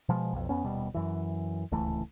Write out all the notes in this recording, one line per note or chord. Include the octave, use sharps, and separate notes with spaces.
B2 F3 G#3
B1 F2
F2 B3 C#4
D#1 B2 G3
F#2 E3
D1 C#2 E3 A3